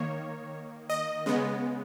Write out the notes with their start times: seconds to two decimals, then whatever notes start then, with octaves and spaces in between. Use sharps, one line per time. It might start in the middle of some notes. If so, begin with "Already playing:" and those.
Already playing: D#3 A#3 C#5
0.90 D#5
1.26 C#3 G#3 B3